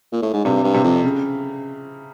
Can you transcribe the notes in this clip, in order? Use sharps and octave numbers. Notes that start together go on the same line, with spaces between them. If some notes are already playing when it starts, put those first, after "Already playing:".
A#2
A2
G#2
G2 C3
G2
C3
F2
C#3